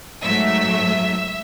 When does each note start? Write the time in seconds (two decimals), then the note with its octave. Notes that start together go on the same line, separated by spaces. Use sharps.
0.23 G#2 F#3 A3 E5